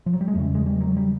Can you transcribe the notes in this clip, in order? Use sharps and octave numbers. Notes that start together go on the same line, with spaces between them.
F3
F#3
G3
G#3
E2 C#3 A3
G#3
G3
F#3
G3